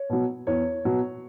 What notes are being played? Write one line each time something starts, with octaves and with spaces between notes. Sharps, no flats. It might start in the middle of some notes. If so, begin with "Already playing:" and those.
Already playing: C#5
B2 F#3
E2 C#5
B2 F#3